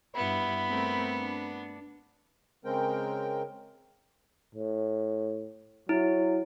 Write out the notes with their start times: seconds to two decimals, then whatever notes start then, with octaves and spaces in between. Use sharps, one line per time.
0.15 G2 B3 E4 B5
0.68 A3 C4 A#4
1.16 D4
2.65 C#3 G#3 C4 A#4 G5
4.55 A2
5.89 F#3 E4